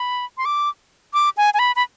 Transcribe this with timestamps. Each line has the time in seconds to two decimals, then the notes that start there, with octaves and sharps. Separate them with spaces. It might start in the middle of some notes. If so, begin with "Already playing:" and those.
Already playing: B5
0.38 C6
0.45 D6
1.14 D6
1.37 G#5
1.54 G#5
1.59 B5
1.76 B5